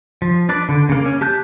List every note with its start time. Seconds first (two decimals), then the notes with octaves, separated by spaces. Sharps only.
0.22 F3
0.49 D4 B4 D5
0.69 D3
0.89 C#3 A#3
1.06 C#4
1.21 G4 A5 F#6 G6